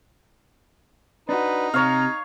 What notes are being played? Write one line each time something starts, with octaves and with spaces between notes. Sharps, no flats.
D4 D#4 F#4 B4
C3 C#5 F5 A#5